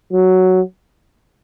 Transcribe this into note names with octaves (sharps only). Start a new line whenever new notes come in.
F#3